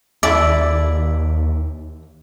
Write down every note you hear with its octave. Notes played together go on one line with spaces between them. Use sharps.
D#2 E4 D5 E5